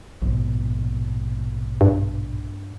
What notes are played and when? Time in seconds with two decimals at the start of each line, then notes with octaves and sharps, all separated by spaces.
0.22 A#1 G#2 B2
1.81 G2